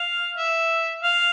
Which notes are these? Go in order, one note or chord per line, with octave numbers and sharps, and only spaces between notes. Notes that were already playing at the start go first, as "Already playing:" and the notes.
Already playing: F5
E5
F5